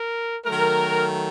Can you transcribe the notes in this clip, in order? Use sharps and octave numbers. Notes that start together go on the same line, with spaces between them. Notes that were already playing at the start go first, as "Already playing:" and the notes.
Already playing: A#4
D#3 F#3 A3 A#4